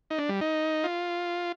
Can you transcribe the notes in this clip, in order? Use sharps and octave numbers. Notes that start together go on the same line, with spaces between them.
D#4
D4
G3
D#4
F4